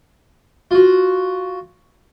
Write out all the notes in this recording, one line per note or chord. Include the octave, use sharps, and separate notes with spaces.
F4 F#4